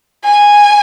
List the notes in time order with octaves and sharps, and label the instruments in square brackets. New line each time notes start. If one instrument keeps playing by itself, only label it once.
[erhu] G#5